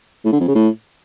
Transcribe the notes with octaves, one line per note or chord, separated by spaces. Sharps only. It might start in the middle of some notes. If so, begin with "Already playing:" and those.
A2
D3
F2
C#3
A2